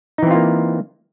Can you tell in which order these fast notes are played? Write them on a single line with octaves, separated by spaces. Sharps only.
D#4 E3 C4 F4 A#3